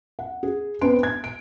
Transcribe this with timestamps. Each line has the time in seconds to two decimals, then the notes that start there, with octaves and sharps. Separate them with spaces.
0.19 F#5
0.43 G#4
0.81 B3 C4 D4 B4 C6 D7
1.03 G#6
1.24 D7